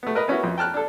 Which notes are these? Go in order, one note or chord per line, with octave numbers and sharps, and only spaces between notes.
A3 B3
A#4 B4 D#5
B3 C#4 E4 F#4
F2
G5 A5 F6 F#6
D4 A4